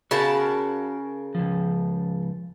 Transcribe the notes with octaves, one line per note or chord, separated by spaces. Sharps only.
C#3 F#4 A#4 A5 B5
C#2 F3